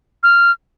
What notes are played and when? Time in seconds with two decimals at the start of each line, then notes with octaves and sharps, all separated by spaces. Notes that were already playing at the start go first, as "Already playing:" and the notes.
0.23 F6